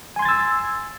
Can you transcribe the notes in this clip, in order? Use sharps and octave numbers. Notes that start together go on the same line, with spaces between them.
G#5 C6 E6 G#6 A6